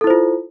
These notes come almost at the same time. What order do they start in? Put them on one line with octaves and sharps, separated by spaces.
A4 E4 C5 F4